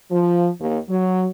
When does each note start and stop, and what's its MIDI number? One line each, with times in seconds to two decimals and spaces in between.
0.11 0.49 53
0.60 0.78 39
0.89 1.26 54